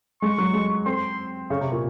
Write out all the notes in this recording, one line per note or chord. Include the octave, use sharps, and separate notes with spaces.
G#3 C#6
F#3
G#3
C4 C6
C#3 C#6
C3
A#2